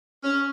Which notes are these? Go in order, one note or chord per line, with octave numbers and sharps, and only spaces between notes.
C#4